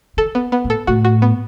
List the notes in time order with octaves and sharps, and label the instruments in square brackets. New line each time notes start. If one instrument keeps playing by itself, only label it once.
[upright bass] D#3 [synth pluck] A4
[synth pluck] B3
B3
[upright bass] A2
[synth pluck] A4
[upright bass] A2 [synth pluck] F#4
[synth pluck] F#4
B3